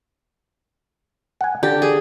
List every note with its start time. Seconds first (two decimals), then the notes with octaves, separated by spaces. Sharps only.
1.41 F#5 G#5
1.63 D3 G4
1.82 G#4